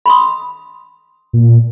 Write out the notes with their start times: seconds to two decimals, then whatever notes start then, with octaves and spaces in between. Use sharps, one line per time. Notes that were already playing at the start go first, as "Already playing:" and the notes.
0.06 B5 C6 D#6
1.33 A#2